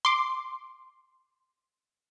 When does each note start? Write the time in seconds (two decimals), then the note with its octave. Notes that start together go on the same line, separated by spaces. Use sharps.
0.05 C6 D6